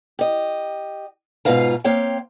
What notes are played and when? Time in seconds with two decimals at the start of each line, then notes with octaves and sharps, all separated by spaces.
0.19 G4 D#5
1.45 G#2 B2 F4 B4 F5 A#5
1.84 A#3 C4 C#5 F5 G5